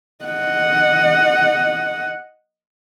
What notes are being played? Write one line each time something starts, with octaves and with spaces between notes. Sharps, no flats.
D#5 F#5